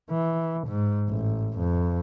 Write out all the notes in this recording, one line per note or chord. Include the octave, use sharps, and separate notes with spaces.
E3
G#2
A1
F2